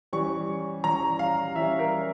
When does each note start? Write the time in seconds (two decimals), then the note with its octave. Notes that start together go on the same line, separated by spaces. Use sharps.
0.13 E3 G3 C#4 C#6
0.84 E3 G3 C#4 A#5
1.19 F5
1.55 E3 G3 C#4 E5
1.79 A#4